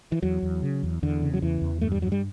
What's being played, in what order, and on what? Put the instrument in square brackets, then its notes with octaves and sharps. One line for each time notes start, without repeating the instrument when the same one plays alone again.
[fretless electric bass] E3
E2 F#3
E2
C#3
E2
E2 D3
C#3
F#3
E2 E3
E2
G2 A3
G3
G2 F#3
G3